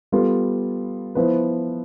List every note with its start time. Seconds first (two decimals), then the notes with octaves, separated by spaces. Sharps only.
0.12 G3 B3 F4 A4
1.15 F3 B3 E4 B4